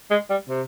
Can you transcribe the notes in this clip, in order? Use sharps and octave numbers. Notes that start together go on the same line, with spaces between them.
G#3
G3
C3